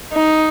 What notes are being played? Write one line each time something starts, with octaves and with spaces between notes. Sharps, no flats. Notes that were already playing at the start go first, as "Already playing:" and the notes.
D#4